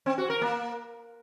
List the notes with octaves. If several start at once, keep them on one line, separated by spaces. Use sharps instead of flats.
C4
F#4
A#4
A#3